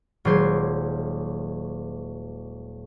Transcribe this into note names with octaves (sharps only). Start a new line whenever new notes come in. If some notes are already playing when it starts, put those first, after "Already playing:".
D#1 F#3 G#3 C5 G#6